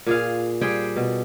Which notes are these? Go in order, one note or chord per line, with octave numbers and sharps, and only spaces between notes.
A#2 G#4 F5
G3 G#4 C5 G5
B2